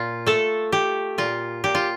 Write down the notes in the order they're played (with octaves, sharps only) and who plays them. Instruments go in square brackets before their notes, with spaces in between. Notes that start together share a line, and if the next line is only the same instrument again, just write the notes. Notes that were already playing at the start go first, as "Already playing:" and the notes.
Already playing: [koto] A#2 F4
A3 A4
A3 G4
A#2 F4
A#2 G4
F4